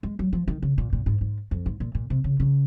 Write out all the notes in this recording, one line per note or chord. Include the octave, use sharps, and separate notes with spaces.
G#3
F#3
F3
D#3
C#3
A#2
A#2
G#2
G#2
F2
G#2
A#2
A#2
C3
C#3
C#3